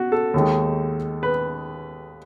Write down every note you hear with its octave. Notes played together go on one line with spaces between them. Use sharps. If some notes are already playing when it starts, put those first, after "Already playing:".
Already playing: B3 F#4
A4
D#2 D#3 G#3
B4